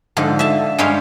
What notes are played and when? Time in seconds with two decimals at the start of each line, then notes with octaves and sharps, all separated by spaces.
0.17 G#2 D3 F3
0.39 E5 A5
0.78 G2 G3 G#3 C#5 F5